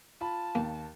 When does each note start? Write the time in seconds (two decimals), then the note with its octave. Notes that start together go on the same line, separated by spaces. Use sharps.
0.21 F4 A5 B5
0.55 D#2 A#3